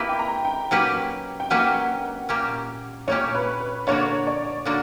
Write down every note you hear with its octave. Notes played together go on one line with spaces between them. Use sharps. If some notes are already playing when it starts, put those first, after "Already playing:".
Already playing: A#3 E4 G4 B4 B5
G5
A#5
G5
F#3 A#3 C#4 G4 B4
G5
F#3 A#3 C#4 G4 B4 F#5
A#2 A#3 C#4 G4
A#2 A#3 C#4 G4 C#5
B4
B4
D3 A#3 D4 F#4 C#5
D5
D3 A#3 D4 F#4